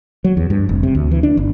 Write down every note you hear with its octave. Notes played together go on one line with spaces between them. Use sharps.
F#3
E2
G2
F1
C3
D2
E3
D4
G1